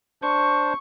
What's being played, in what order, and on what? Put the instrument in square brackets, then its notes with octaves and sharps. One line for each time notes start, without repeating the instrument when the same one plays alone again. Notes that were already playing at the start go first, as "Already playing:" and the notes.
[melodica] D4 C5 [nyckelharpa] C#6